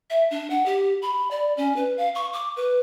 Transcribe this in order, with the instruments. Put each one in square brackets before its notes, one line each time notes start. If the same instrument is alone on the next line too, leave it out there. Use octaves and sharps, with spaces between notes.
[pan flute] E5
D4
F#5
G4
B5
D5
C#4
B4
F5
C#6
D6
B4